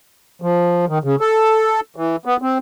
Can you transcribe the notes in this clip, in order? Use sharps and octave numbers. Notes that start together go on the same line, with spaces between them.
F3
D#3
C#3
A4
E3
B3
C4